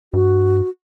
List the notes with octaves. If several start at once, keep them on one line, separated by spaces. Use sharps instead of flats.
G2 F#4